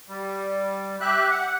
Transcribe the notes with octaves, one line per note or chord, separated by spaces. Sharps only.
G3
G4 E5 F#6
F#5